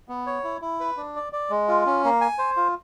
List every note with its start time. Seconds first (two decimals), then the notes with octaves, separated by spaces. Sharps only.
0.09 B3
0.27 C#5
0.44 E4
0.62 E4
0.80 B4
0.97 D4
1.16 D5
1.33 D5
1.50 G#3
1.68 F4
1.86 C#4
2.04 A#3
2.21 G#5
2.38 C5
2.57 F4